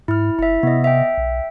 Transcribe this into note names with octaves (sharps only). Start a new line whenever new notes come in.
G#2 E4 F6
F#1 E4 E5
C3 B3 D#5
E5 G5
B1